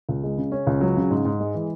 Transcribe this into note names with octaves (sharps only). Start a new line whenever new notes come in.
C#2
G#3
C#3
C#4
C#2
F#3
C#3
G#2
G#2
G#3
E3